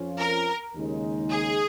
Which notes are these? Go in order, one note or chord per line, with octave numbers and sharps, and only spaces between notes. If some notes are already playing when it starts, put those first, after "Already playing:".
Already playing: F2 F3 C#4 F4
A#4
D#2 C#3 G#3 D#4
G#4